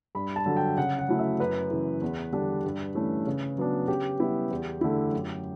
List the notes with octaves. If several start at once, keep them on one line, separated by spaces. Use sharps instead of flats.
G2 B5
A5
D3 F#3
G5
C#3 F#5
F#5
F#3 A3 E4
E5
F#2 B4
C#3 E3
E2
D3 G3 D4
G2
E3 A3 C#4
C#3
F#3 B3 D4
C#3 G4
G3 B3 E4
E2
D3 A3 E4
F#2